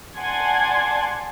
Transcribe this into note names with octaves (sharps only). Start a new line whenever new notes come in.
D5 F#5 G#5 A5 C6 G#6